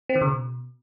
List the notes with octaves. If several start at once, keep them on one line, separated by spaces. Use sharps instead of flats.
C4
D#3
C#3
B2